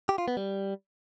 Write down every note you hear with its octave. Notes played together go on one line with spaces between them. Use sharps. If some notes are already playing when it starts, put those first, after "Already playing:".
G4
F4
B3
G3